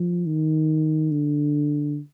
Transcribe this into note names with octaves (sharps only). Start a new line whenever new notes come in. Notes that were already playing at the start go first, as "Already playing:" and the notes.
Already playing: F3
D#3
D3